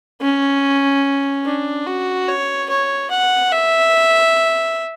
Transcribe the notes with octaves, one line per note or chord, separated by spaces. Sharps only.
C#4
D4
F#4
C#5
C#5
F#5
E5